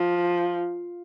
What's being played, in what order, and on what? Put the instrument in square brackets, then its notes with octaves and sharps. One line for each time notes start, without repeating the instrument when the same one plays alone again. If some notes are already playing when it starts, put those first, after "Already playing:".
Already playing: [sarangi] F3